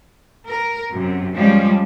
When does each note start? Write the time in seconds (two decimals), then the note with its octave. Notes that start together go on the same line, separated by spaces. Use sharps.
0.48 A#4
0.91 F#2 C3
1.35 F3 G3 G#3 C#4